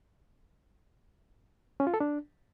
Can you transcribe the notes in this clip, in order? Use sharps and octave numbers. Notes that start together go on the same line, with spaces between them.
C#4
F4
A4
D4